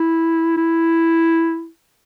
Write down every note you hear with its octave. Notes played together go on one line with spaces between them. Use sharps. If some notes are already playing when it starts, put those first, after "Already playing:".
Already playing: E4
E4